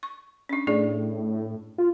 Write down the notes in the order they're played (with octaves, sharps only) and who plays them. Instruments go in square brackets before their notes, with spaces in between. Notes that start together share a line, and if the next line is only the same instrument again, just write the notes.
[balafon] C#6
C#4 D4
[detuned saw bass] A2 [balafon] D4 G#4 D5
[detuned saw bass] F4